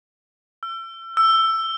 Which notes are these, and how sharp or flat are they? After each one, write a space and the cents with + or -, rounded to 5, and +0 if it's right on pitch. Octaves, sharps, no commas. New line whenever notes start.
E6 +35
E6 +10